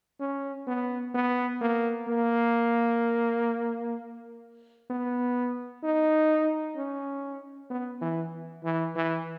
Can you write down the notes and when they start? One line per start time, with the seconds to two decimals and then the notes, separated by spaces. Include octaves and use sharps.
0.20 C#4
0.67 B3
1.15 B3
1.61 A#3
2.08 A#3
4.90 B3
5.83 D#4
6.76 C#4
7.70 B3
8.01 E3
8.64 E3
8.96 E3